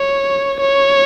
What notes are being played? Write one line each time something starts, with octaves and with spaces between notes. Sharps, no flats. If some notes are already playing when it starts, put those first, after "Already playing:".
Already playing: C#5
C#5